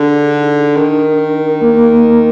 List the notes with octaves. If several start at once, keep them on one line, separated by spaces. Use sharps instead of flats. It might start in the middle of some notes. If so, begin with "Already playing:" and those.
Already playing: D3 G#4
D#4
D#3 D4
A#4
A#3
A#4